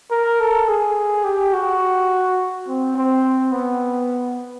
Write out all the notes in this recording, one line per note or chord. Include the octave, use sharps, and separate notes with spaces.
A#4
A4
G#4
G4
F#4
C4
C4
B3